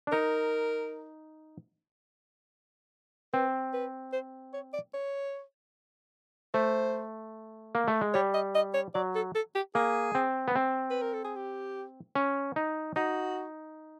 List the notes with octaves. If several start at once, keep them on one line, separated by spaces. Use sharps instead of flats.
D4
D#4 A#4
C4 B4
B4
C5
C#5
D5
C#5
A3 C5
A#3
A3
G#3
G3 C#5
D#5
D#5
C#5
F#3 D5
A4
A4
G4
A#3 G#4
C4
B3
C4
B4
A#4
A4
G#4
G4
C#4
D#4
D#4 F#4